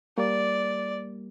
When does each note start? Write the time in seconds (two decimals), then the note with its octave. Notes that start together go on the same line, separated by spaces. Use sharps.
0.18 G3 A#3 D5